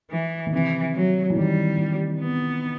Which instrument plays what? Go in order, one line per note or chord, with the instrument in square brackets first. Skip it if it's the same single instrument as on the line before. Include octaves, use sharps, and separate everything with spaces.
[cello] E3
[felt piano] D#3
[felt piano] C3 [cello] E3
[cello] F#3
[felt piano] E3
[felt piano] D#3 [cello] G3
[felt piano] E3
[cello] B3